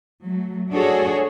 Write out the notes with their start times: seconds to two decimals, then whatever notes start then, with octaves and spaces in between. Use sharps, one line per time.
0.23 F#3 A3
0.72 D4 F#4 G#4 A4 C#5